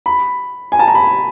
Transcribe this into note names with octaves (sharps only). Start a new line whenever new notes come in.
B5
G#5
A5
A#5
B5